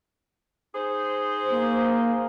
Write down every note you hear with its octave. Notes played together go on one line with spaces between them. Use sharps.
D#4 G#4 C5
A#3